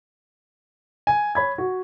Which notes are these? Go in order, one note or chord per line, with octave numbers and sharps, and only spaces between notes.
G#5
C#5 B5 G#6
F#4